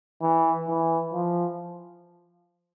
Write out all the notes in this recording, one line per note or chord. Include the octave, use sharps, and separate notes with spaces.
E3
E3
F3